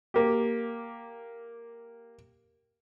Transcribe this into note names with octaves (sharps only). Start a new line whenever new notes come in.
A#3 G4